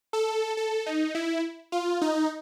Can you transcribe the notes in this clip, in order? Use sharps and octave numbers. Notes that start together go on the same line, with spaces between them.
A4
A4
D#4
E4
F4
D#4